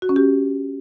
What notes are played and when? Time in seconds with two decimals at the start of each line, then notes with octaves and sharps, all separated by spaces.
0.02 F#4
0.09 C#4
0.16 G4